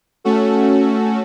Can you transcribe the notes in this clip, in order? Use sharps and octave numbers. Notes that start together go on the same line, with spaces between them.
A3 C#4 F#4 A4